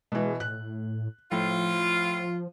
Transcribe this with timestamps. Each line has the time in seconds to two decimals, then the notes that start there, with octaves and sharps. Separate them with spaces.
0.12 B2 E3 G#3
0.40 A2 F#6
1.32 A2 F3 F4